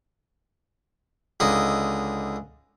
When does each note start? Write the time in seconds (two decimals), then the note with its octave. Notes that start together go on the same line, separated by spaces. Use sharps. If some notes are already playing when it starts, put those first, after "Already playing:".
1.40 C#2 D3 D#4